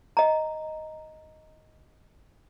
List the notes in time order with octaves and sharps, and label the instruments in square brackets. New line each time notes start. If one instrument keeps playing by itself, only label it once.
[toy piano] D#5 A#5